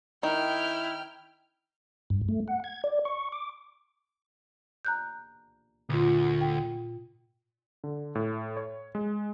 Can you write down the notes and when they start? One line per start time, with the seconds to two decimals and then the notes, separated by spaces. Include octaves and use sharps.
0.23 D#3 E4 G5 F6
2.10 G2
2.29 A3
2.48 F#5
2.64 G#6
2.84 D5
3.05 C#6
3.32 D6
4.85 A#5 F#6 G6
5.89 D2 A#2 F4
6.41 G5
7.84 D3
8.15 A2
8.57 C#5
8.95 G#3